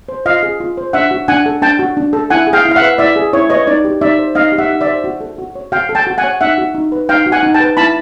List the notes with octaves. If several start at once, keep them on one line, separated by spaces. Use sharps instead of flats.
C5
F4 D#5 F5
G#4
F4
C5
D4 E5 F#5
F#4
D4 F#5 G#5
A4
D4 G5 A5
F#4
D4
A4
E4 F#5 G#5
G#4
F5 G5
E4
F5
E5 F#5
B4
E4 D5 E5
G#4
E4 C#5
B4 C#5 D#5
D#4 D5
G4
D#4 D5 E5
C5
D#4 D#5 F5
G4
E5 F#5
D#4
D5 E5
C5
F#4
A4
F#4
C#5
F#4 F5 G5
A4
G5 A5
F#4
F#5 G#5
C#5
D#4 E5 F#5
F#4
D#4
B4
D#4 F5 G5
F#4
F#5 G#5
D#4
G5 A5
B4
E4 A5 B5